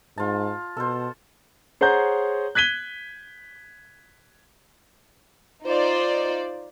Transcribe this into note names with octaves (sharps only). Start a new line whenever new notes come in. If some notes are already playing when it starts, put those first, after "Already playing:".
G#2 F4 A5
B2 A4 C5
G#4 C5 C#5 F#5 A#5 G6
F#6 G#6 B6 D#7 G7
D#4 F4 C5 D5